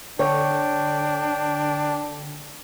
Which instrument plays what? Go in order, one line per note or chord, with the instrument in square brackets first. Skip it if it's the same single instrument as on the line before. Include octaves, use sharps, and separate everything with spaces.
[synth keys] D3 [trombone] D4 [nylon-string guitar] C#5 [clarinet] G5